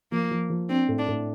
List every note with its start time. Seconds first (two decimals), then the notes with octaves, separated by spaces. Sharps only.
0.12 F3 A#3
0.31 F3
0.50 F3
0.69 C4 D4
0.89 A2
0.98 D4
1.08 A2